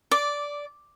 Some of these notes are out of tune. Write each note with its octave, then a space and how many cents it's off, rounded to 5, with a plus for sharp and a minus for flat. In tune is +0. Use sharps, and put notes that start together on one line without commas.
D5 -10 D6 +0